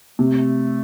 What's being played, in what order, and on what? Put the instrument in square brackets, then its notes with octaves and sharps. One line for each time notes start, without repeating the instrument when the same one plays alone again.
[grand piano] C3 [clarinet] A3